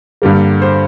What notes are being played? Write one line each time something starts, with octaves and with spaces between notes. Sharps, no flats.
G2 D3 G3 A#3
C5